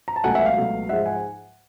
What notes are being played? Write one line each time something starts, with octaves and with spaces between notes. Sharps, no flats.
A#5
A5
C#2 B2 F#3 A3 F#5 G#5
E5 F#5
F5
C#2 B2 F#3 A3
G#2 F3 G#3 E5 F#5
F#5 G#5